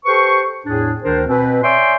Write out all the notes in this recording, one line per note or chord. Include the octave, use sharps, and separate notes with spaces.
G4 A4 B4 C5 C#6
E2 A2 D4 G#4
D2 D#3 D4 A#4 C5
B2 C4 B4
C#5 D5 E5 G5 G#5 C6